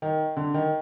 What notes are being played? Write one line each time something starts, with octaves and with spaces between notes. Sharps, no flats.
D#3
D3
D#3